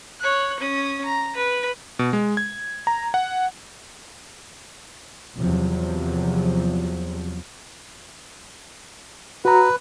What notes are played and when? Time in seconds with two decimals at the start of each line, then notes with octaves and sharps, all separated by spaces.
0.21 C#5 F#6
0.60 C#4 D#6
1.05 A#5
1.36 B4
1.99 B2
2.13 G#3
2.37 G#6
2.87 A#5
3.14 F#5
5.38 E2 C3 F3 F#3
9.45 F#4 B4 A#5